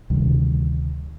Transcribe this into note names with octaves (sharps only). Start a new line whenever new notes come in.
D2 C3 D#3 G3